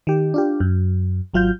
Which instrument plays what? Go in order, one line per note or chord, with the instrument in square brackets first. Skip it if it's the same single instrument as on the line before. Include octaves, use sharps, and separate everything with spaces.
[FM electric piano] D#3 G4
D4 F4 G4
F#2
G#1 F#3 F4 F5 G6